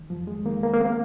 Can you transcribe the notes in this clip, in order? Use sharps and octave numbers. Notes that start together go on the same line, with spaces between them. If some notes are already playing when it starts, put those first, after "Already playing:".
Already playing: D#3
F2 F3
G#3
D#3 A#3
A#3
A#3
C4